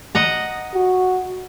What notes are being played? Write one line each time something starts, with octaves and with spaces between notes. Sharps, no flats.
D#5 F#5 A#5
F#4